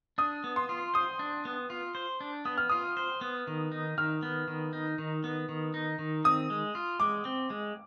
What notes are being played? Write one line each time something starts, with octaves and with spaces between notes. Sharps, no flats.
D4 D#6
B3
C6
F4
C5 D#6
D4
B3
F4
C5
D4
B3 D#6
F6
F4 D#6
C5
B3
D#3
D#4
D#3 F6
B3
D#3
D#4
D#3
B3
D#3
D#4
D#3
C4 D#6
G#3
F4
G#3 D6
C4
G#3